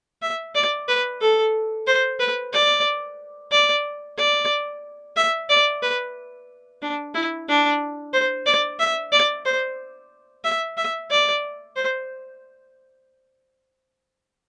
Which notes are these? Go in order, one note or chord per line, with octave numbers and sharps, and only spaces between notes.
E5
D5
B4
A4
C5
B4
D5
D5
D5
E5
D5
B4
D4
E4
D4
C5
D5
E5
D5
C5
E5
E5
D5
C5